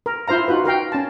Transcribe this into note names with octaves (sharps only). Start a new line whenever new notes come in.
A#4
E4 F4 C5 F5 A#5
D#4 F4 F#4 B4
F#4 A#4 F5 G5
C#4 A5